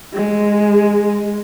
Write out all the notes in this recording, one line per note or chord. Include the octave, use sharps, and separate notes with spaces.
G#3